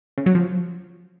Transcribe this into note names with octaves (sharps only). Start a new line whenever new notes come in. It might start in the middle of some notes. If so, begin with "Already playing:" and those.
C#3
F#3
F3